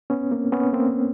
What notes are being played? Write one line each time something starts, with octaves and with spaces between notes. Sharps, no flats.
B3 C#4
A#3 C4
B3 C#4
A#3 C4